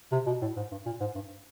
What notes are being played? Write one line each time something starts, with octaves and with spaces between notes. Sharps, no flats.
C3
B2
A2
G#2
G2
A#2
G#2
G2